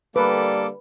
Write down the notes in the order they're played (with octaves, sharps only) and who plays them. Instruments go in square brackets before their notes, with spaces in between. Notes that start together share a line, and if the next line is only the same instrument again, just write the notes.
[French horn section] D3 G3 [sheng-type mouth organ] A#3 A4 D6 [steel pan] B4